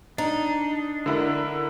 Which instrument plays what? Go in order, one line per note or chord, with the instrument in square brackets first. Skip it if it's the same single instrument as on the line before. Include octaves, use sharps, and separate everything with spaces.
[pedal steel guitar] D4 [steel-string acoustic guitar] D#4
[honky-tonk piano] D3 E4 A#4